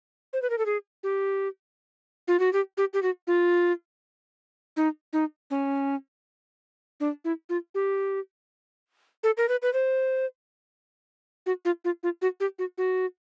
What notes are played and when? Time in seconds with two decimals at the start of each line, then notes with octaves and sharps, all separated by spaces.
0.33 C5
0.42 B4
0.50 A#4
0.58 A4
0.66 G#4
1.03 G4
2.28 F4
2.39 F#4
2.53 G4
2.77 G4
2.93 G4
3.03 F#4
3.27 F4
4.76 D#4
5.13 D#4
5.50 C#4
7.00 D4
7.24 E4
7.49 F4
7.75 G4
9.23 A4
9.37 A#4
9.49 B4
9.62 B4
9.73 C5
11.46 F#4
11.65 F4
11.84 F4
12.03 F4
12.22 F#4
12.40 G4
12.59 F#4
12.78 F#4